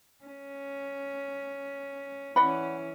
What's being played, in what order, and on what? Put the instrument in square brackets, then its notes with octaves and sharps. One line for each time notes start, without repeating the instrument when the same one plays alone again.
[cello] C#4
[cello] E3 C#4 [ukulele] D5 F#5 B5